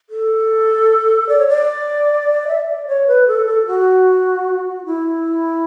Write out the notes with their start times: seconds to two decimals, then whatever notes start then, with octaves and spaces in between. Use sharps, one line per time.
0.10 A4
1.29 D5
1.39 C#5
1.48 D5
2.48 E5
2.68 D5
2.88 C#5
3.07 B4
3.28 A4
3.46 A4
3.67 F#4
4.86 E4